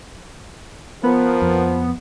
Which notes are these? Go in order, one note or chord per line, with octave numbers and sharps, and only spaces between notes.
F3 B3 A#4
F2